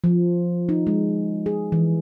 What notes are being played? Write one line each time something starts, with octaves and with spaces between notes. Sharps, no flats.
F3
D#4
G#3
G#4
E3